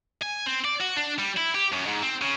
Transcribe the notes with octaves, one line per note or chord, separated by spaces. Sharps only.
G#5
C4
D5
F#4
D4
G3
E4
G4
F#2
G#2
C4
C#3